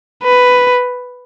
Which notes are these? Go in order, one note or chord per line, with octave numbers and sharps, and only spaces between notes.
B4